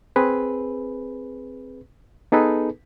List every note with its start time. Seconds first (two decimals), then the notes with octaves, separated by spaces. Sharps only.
0.16 C4 G#4 B4
2.32 B3 D#4 G#4 A4 B4